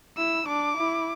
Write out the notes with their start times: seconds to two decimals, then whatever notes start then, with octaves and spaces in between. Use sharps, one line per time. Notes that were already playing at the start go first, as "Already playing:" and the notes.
0.18 E4 E6
0.47 D4 D6
0.77 E4